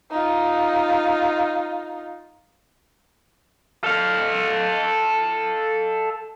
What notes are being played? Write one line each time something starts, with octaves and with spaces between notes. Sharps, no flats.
D#4 F4
A4 F5